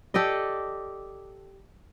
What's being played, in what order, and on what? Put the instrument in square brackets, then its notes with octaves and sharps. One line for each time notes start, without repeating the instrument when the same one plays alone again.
[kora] G4 A4 D5 D#5